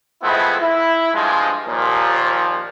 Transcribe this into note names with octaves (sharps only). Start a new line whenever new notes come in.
F3 G#3 A3 B3 C4 E4
E4
G2 F3 G#3
D#2 A#2 F3